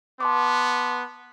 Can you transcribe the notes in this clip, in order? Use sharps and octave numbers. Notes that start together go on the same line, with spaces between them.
B3 A5 C6 D6